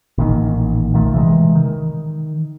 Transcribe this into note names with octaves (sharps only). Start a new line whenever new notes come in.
A1 A#2 D#3
B1 A#2 D#3 A3
C3 E3 F#3 G#3
D#3